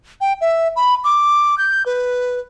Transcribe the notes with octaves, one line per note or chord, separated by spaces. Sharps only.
G5
E5
B5
D6
G6
B4